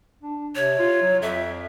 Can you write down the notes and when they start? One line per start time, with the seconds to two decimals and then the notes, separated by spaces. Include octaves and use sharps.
0.22 D4
0.55 C3 C#5
0.79 F4
1.02 F#3
1.22 F2 E5